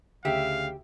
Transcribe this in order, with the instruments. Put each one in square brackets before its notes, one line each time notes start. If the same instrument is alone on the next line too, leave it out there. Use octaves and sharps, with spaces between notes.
[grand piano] D2 C#3 G5 [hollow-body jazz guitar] G4 [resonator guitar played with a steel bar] E5 [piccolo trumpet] F5